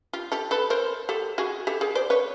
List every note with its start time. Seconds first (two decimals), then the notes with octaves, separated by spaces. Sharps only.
0.13 F4 G4
0.32 G4 A4
0.51 A4 B4
0.70 A#4 C5
1.09 G4 A4
1.38 F#4 G#4
1.67 G4 A4
1.81 G#4 A#4
1.95 C5 D5
2.10 B4 C#5